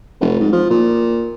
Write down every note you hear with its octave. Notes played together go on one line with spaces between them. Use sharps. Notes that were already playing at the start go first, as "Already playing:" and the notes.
F1
G#2
F3
A#2